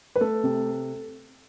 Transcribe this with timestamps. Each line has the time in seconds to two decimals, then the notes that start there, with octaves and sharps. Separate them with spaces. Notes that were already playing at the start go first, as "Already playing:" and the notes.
0.16 B4
0.21 A3 A4
0.43 C3